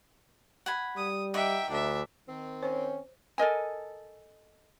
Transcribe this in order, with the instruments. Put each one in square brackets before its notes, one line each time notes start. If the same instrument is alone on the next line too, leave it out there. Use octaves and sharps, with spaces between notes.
[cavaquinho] F#5 G#5 B5
[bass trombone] G3 [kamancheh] D#6
[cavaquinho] D#4 F#5 D6 [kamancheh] E5 G5
[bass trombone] D2 [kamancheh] D4 E5
[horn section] D#3 C4
[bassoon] C#4 [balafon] C5 C#5
[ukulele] A4 A#4 D#5 G#5